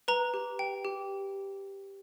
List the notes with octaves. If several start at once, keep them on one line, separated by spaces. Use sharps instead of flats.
B4 A#5
G4
G5
G4